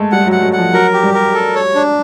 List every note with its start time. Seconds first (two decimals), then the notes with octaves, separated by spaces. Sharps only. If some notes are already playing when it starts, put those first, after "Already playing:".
Already playing: G#3 A3
0.12 G3 F#5
0.27 F#3
0.32 F#5
0.42 F#3
0.53 F#5
0.58 F3
0.73 F#3 A#4
0.93 G4
1.03 G3
1.14 A#4
1.34 A4
1.55 C#5
1.75 D4